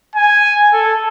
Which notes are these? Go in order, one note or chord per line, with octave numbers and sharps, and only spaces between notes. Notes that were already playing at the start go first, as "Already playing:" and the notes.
G#5
A4